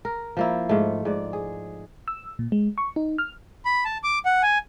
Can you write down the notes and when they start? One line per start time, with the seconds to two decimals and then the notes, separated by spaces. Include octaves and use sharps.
0.05 A#4
0.37 F3 A#3 E4
0.69 G#2 A3
1.05 G#2 D5
1.33 G#4
2.08 E6
2.39 A#2
2.52 G#3
2.78 C#6
2.96 D#4
3.18 F6
3.65 B5
3.85 A5
4.04 D6
4.25 F#5
4.43 G#5